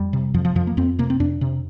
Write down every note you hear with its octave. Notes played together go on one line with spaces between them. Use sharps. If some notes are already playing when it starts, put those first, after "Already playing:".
Already playing: F2 G3
C3
F2 F3
F3
F2 F3
A#3
F2 C4
C3 A#3
C4
F2 D4
C3